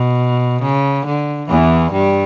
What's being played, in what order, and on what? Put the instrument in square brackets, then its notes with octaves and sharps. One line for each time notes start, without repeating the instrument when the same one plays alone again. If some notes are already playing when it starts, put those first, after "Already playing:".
Already playing: [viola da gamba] B2
C#3
D3
E2 E3
G2 G3